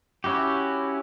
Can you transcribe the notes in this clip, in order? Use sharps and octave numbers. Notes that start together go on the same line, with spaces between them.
C#4 E4 F#4 G4